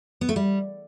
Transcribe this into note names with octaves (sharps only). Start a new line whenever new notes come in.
B3
A3
G3